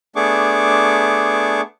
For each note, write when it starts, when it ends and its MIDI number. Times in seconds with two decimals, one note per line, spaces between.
0.16 1.61 57
0.16 1.61 59
0.16 1.61 62
0.16 1.61 68
0.16 1.61 85
0.16 1.61 86